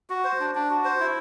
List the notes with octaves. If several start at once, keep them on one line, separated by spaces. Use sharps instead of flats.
F#4
C5
D4
D4
F#4
C5
E4